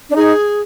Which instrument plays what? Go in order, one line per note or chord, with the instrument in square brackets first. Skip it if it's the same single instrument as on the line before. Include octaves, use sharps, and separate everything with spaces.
[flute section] D4
[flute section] D#4 [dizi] G#4